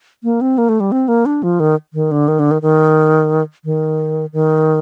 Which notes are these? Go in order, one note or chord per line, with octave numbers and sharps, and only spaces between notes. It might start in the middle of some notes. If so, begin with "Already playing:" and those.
A#3
C4
A#3
A3
G3
C4
A#3
D4
F3
D#3
D#3
D3
D#3
D3
D#3
D#3
D#3
D#3